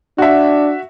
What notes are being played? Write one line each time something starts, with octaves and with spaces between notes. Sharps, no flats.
D4 F#4 E5